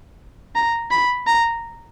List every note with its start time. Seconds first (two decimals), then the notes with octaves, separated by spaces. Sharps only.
0.55 A#5
0.91 B5
1.27 A#5